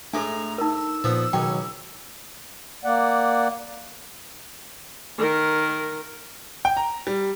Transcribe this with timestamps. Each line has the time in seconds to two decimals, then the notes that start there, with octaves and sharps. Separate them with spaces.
0.13 A2 G#3 A3 D4 A4 A#5 D6
0.58 D#4 A#4 E6
1.04 A#2 F3 B3
1.33 C#2 B2 D#3 F#3 C#4 G5
2.85 A#3 D5 F#5
5.18 D#3 A#4
6.65 G5
6.77 A#5
7.07 G3